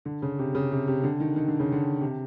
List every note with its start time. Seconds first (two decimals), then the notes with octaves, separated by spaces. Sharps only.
0.05 D3
0.22 C#3
0.39 C3
0.55 C#3
0.72 C3
0.88 C3
1.03 D3
1.20 D#3
1.36 D#3
1.48 D3
1.60 C#3
1.72 D3
2.01 C3